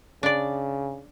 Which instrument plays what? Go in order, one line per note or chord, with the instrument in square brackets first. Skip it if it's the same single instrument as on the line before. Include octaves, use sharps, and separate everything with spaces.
[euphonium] C#3 [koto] D4 D5